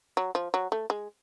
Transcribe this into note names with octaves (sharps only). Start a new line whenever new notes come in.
F#3
F3
F#3
A3
G#3